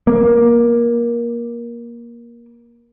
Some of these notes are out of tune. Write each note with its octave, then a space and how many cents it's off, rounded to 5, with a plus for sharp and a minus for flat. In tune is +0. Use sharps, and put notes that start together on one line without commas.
A#3 +20